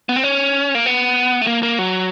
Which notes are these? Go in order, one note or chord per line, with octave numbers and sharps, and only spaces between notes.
B3
C4
C#4
A#3
B3
A3
A#3
A#3
F#3